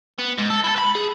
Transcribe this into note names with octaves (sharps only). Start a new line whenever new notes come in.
B3
G#2
A4
E4 A4
B4 B5
G#4